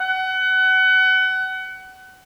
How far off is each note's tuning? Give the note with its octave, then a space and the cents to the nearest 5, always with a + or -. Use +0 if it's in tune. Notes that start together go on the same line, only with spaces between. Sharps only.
F#5 +25